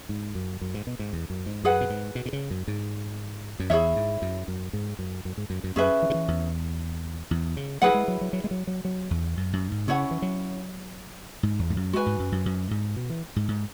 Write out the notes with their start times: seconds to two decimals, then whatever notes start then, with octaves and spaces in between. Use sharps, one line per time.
0.09 G#2
0.35 F#2
0.61 F#2
0.74 G#2
0.87 B2
0.99 G#2
1.13 E2
1.30 F#2
1.46 G#2
1.63 F#2 G#4 B4 F#5
1.81 B2
1.90 G#2
2.15 B2
2.26 B2
2.33 C#3
2.51 F#2
2.68 G#2
3.60 F#2
3.70 E2 E4 G#4 C#5 E5
3.96 G#2
4.22 F#2
4.48 F#2
4.73 G#2
4.99 F#2
5.25 F#2
5.38 G#2
5.50 F#2
5.64 F#2
5.76 F#2 C#4 G#4 B4 E5
6.02 E3
6.10 C#3
6.14 E3
6.28 E2
7.31 E2
7.57 C#3
7.82 F#3 E4 G#4 B4 F#5
7.94 G#3
8.08 F#3
8.21 F#3
8.33 F#3
8.44 G#3
8.51 F#3
8.67 F#3
8.85 F#3
9.11 E2
9.37 F#2
9.53 F#2
9.71 G#2
9.87 C#3 C#4 E4 C#5 F#5
10.11 E3
10.22 F#3
11.43 G#2
11.59 E2
11.70 G#2
11.77 F#2
11.93 G#3 F#4 B4 G#5
12.06 G#2
12.19 F#2
12.32 F#2
12.46 F#2
12.71 G#2
12.96 B2
13.10 E3
13.36 G#2
13.48 G#2